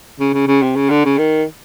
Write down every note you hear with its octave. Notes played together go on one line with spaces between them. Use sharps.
C#3
C#3
C#3
C3
C#3
D3
C#3
D#3